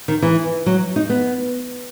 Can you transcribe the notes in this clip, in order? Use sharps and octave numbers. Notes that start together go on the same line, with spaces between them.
D#3
E3
F#3
D#4
B3